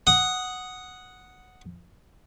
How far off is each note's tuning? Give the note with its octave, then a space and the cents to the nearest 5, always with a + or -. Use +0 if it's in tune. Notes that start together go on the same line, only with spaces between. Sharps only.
F#5 +0 D#6 +0